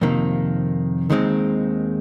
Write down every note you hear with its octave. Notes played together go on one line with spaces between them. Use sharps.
F2 C3 D#3 A#3
D#2 D#3 G#3 C4 D#4